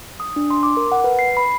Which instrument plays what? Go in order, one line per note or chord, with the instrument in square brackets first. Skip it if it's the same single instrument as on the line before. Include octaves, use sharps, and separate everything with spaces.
[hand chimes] D#6
D4
C6
D6
A#4
F#5
B4
C7
B5